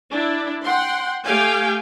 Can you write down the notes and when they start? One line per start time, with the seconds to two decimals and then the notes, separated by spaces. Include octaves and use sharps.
0.10 D4 E4
0.64 F#5 G5 C6
1.24 A3 G4 F5 G5 G#5